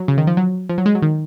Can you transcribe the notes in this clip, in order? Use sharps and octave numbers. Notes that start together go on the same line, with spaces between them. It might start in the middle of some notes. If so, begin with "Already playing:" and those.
Already playing: F#3
C#3
D#3
F3
F#3
F3
F#3
G#3
F#3
D#3